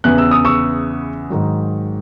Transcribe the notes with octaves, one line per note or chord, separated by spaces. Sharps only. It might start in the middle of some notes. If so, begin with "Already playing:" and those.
E2 C#3 E3 B3 F#6
E6
D#6
C#6 E6
G#2 D#3 F#3